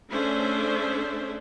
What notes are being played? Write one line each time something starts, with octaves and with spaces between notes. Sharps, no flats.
A3 C#4 D4 G#4 C5 E5